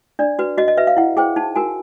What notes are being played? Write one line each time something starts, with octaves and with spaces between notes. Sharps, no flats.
D4 D5
F#4 B4
F#4 D#5
D#5
B4 E5
F5
E4 F#5
G#4 C5 G5
D#4 A5
F#4 A#4 G#5